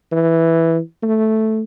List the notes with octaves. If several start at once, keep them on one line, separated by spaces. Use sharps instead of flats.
E3
A3